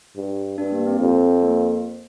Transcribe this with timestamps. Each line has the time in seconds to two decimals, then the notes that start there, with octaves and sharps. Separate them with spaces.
0.16 G2
0.58 G2 D4
0.72 A#3
0.87 C4
1.00 F2 C4
1.43 A#3